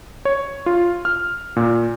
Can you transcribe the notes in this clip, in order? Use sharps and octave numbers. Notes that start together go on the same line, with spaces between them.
C#5
F4
F6
A#2